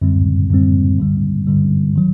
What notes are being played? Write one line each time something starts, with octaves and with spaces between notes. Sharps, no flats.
F#2 D3 G3 C4
F#2 D3 G3 C4
G2 D3 G3
G2 D3 G3
D#3 F#3